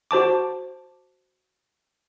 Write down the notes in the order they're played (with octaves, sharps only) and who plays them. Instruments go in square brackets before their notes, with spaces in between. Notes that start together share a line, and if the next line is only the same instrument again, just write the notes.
[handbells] F#4 C5 A5 D6